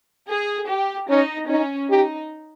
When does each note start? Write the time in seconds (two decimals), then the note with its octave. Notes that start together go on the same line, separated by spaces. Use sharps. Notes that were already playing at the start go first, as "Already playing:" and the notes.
0.29 G#4
0.69 G4
1.09 C#4 D#4
1.49 C#4 D#4
1.90 D#4 G4